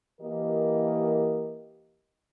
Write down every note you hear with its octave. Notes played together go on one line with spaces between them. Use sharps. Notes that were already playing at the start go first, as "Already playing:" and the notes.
E3 A#3 G4 A#4 D#5